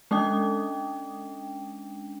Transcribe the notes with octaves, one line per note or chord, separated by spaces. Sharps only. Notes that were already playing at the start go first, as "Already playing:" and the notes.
G#3 C#4 D4 G5